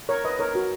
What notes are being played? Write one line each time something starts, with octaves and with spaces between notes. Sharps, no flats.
A#4 C#5
B4 D#5
A#4 C#5
F#4 A#4